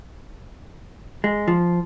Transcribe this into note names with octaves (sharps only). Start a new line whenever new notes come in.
G#3
F3